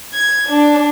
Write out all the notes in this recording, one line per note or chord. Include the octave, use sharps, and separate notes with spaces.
G#6
D4